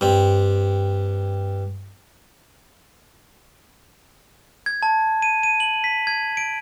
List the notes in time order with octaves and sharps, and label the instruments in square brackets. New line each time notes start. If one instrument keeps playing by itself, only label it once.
[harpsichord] G2 C4
[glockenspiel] G#6
A5
D#7
D#7
F#7
B6
G#6
D7